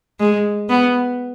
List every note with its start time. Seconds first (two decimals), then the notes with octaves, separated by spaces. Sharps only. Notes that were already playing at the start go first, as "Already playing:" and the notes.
0.20 G#3
0.69 B3